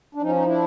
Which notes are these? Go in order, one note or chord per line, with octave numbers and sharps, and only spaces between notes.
D4
F3 C#4 D#4
D#4
D4 E4